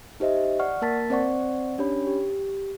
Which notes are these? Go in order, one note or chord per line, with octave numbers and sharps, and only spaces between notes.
D#4 G4 C5 D#5 E5
D5 F#5 C#6 F6
A#3 A#4 A5 A6 B6
C4 C5 D5 F#5 C#6
C#4 D4 G4 C#5 B5
G4